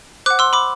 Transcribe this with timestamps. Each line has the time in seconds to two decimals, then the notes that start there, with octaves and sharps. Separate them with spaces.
0.26 C5 F#5 D6 F#6
0.39 C6 E6
0.53 B5 D6